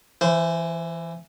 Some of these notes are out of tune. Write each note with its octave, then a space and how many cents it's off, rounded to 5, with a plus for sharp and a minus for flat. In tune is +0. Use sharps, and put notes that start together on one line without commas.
E3 +15 C5 -20